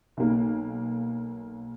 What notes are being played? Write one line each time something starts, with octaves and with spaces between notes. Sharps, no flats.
B1 A#3